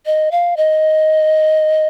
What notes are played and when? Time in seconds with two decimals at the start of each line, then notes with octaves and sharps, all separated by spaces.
0.06 D#5
0.31 F5
0.57 D#5